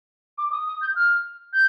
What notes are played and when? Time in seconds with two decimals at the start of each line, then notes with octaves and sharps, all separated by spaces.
0.38 D6
0.52 D#6
0.67 D#6
0.82 G6
0.96 F6
1.53 G6